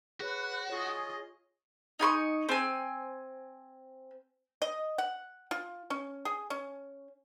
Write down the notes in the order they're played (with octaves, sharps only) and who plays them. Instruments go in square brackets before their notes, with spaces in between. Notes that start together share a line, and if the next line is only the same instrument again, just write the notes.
[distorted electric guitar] F#4 [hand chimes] G#4 C#5 [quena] B4
[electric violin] F4 D#5 [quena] G#4 [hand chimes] C#5 C#6
[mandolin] D#4 G#5 C6 C#6
C4 G#5
[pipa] D#5
F#5
F4
C#4
G#4
C#4